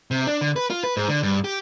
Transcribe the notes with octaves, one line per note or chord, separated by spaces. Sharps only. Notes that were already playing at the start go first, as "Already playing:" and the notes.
C3
D4
D3
B4
F4
B4
G#2
D3
G2
G4